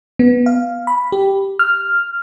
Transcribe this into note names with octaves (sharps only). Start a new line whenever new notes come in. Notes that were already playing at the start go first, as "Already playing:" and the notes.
B3
F5
B5
G4
F6